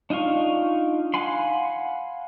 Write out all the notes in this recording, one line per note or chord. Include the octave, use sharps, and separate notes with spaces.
D4 D#4 F4 F5 C#6
F5 F#5 G#5 B5 C6